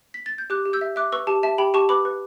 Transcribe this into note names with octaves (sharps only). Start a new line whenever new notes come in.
B6
A6
G6
G4 D6 F#6
G4
E6 G6
E5
E5 D6 F#6
B4 C#6 E6
G4 A5
E5 A5
G4 G5 B5
G4 A5 C#6
B4 B5 D6
B4